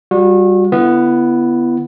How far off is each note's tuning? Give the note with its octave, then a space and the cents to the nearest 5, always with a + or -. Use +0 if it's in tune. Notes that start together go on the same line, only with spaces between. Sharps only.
G3 +0 F#4 -35
D3 +5 B3 +0 E4 +35